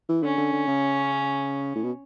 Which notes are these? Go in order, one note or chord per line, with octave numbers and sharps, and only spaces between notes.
E3
D3 C#4
D3
D3
C#3
A2
B2